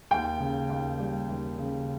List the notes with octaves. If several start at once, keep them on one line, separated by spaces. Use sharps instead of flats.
D#2 G5
C#3
D#2
G3
D#2
C#3